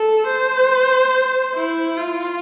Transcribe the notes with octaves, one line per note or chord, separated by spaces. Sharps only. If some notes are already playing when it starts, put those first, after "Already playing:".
Already playing: A4
C5
E4
F4